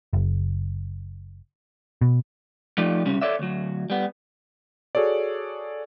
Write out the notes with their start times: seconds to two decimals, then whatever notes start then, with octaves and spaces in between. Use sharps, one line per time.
0.13 F#1
2.01 B2
2.78 F3 A3 D#4 G4 D5
3.05 C2 C#3 G3 C#4
3.21 A4 C#5 D5 E5
3.39 D2 F#3
3.90 G3 B3
4.95 F#4 G#4 A4 C#5 D5